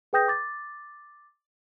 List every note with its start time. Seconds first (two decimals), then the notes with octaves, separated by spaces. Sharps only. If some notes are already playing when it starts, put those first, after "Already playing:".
0.13 G#4 B4 G5 D#6 G6 A#6
0.28 D6 A6